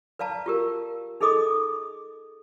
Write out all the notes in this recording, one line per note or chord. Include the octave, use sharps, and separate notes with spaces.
B4 D5 F5 A5 A#5
F4 G4 A#4
D#4 G#4 A4 D#5 D6 D#6